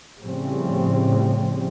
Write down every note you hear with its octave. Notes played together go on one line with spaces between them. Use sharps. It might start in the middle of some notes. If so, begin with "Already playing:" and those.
A2 C#3 F3 G3 C4